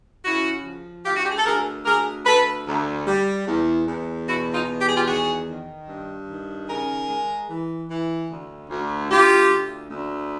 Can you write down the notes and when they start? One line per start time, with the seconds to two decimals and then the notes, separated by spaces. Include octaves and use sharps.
0.25 C#3 E4 F#4
0.65 F3
1.05 D2 F4 G4
1.16 F#4
1.24 G4
1.31 G#4
1.38 A4
1.45 D2 G#4 A#4
1.85 D2 G#4 A#4
2.26 D2 A4 B4
2.66 D2
3.07 G3
3.46 E2
3.87 E2
4.27 B2 E4 F#4
4.53 D#4 F4
4.68 E2
4.80 G4
4.88 G#4
4.96 F4 G4
5.07 D#3 F#4 G#4
5.47 D#3
5.88 G2
6.28 D#3
6.68 C#3 G#4 A#4
7.09 G#3
7.49 E3
7.89 E3
8.29 D2
8.70 D2
9.09 D2 F4 G4
9.50 D2
9.90 D2